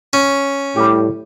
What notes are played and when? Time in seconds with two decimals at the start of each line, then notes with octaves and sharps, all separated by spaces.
0.13 C#4
0.76 A2 G3 G4